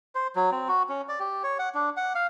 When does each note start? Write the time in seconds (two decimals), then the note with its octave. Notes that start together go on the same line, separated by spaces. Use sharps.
0.15 C5
0.36 F#3
0.52 C4
0.68 F#4
0.89 C#4
1.09 D5
1.20 G4
1.44 C#5
1.59 F#5
1.74 D4
1.97 F#5
2.15 F5